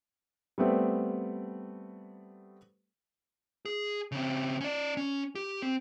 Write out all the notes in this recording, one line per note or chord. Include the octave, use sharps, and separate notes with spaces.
G3 A3 B3 C4
G#4
C#3 C4
C#4 D5
C#4
G4
C4